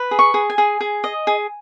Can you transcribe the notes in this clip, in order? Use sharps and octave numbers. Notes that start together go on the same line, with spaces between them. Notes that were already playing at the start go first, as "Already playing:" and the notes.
Already playing: B4
G#4
C#6
G#4
G#5
G#4
G#4
D#5
G#4